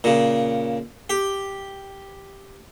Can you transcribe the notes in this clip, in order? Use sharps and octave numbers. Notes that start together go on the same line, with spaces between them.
A#2 C#3
G4